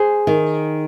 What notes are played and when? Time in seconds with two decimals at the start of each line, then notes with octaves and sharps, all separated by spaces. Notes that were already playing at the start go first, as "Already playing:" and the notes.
Already playing: G#4 C5
0.27 D#3